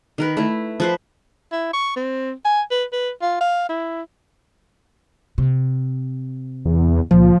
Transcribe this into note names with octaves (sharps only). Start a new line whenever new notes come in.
D#3 A#4 B4
A3 E4
F3 B4 C5
E4
C#6
C4
G#5
B4
B4
F4
F5
E4
C3
E2
C#2 A#2 F3